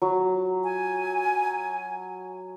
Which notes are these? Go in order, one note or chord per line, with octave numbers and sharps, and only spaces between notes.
F#3
G#5